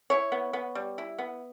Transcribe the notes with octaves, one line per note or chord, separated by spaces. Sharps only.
E4 C#5
B3
B3
G3
E4
B3